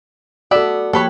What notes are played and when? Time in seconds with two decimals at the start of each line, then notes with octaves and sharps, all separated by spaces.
0.51 B3 F#4 A4 D5 E5
0.93 F3 A#3 G4 A4 B4 C#5